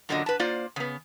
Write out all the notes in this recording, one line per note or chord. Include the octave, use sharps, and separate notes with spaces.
F#2 A#2 D3 F#3 D4 D#5
B4 A5
A#3 F4 C5 D5
C#3 B3